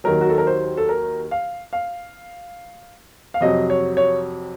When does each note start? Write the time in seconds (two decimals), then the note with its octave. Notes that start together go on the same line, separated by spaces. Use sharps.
0.04 D#2 D#3 F#3 A#4
0.21 F#4
0.29 A4
0.38 A#4
0.47 C5
0.77 A4
0.89 A#4
1.31 F5
1.73 F5
3.34 F5
3.41 F2 C3 F#3 D#5
3.70 C#5
3.97 C#5